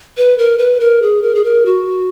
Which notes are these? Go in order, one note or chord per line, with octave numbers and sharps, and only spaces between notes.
B4
A#4
B4
A#4
G#4
A#4
G#4
A#4
F#4